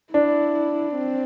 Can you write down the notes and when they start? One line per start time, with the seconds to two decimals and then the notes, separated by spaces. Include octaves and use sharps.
0.13 D4 E4
0.95 C4